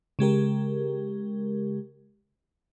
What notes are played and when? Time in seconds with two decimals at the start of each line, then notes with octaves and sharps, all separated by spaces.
0.19 C#3 G#3 G4 A#4